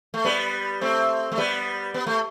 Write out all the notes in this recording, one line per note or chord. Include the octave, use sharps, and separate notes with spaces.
A3
G3 B3
A3 C4
A3
G3 B3
B3
A3